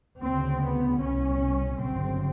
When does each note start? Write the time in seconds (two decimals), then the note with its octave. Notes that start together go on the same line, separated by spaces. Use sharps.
0.20 D2 C#3 C4
0.61 B3
1.00 C2 B2 C#4
1.80 G1 F#2 C#3 C4